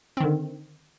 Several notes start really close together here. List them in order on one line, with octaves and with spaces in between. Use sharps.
C4 D#3 D3